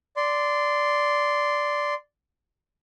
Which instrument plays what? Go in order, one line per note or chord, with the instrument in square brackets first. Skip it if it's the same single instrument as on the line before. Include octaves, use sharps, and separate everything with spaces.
[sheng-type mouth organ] D5 C6